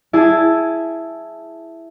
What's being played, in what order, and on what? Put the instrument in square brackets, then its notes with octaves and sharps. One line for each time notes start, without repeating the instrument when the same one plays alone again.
[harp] E4 G#4 G#5 A5